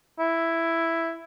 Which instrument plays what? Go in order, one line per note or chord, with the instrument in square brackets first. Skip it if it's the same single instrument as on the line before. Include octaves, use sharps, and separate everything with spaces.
[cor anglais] E4